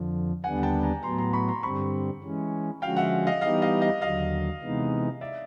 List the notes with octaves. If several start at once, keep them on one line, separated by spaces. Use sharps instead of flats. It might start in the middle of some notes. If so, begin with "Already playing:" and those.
Already playing: F2 D3 F3
D#2 D3 G3 B3 D4 F#5 G#5
G5 A5
G#5 A#5
A2 F#3 B3 A#5 C6
A#5 C6
B5 C#6
A#5 C6
G2 D3 G3 C4 B5 C#6
E3 G#3 C#4
D3 F3 G#3 C#4 F#4 F5 G5
E5 F#5
D#5 F5
E3 G3 B3 D#4 G4 D#5 F5
D#5 F5
D#5 F5
D#2 D3 F#3 D#5 F5
C3 E3 G#3 B3 D#4
D5 E5